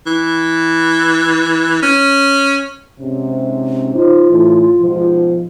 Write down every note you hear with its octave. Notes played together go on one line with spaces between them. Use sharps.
E3
C#4
G#2 C3 C#4
D#4 F4 C5
A2 E3
G#2 B2 F3